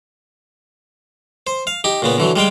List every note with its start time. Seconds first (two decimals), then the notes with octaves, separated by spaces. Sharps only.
1.47 C5
1.67 F5
1.84 D#4 G4
2.02 A#2 C#3 B3
2.18 D3 E3 F#3
2.36 G3 G#3 F5 G5